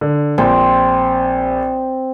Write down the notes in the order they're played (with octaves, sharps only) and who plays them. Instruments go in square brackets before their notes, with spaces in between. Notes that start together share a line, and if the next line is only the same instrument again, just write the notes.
[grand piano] D3
[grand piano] A#1 G5 [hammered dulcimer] C4